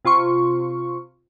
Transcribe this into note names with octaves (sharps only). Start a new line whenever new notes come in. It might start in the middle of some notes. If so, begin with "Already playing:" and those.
C3 F4 C6 C#6